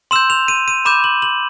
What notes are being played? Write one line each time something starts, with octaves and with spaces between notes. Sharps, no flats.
C6 E6 G6 E7
F7
D#7
D#7
B5 D6 G6 E7
F#7
F#7